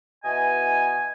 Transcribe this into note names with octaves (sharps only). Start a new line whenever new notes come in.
B2 E3 D#5 G#5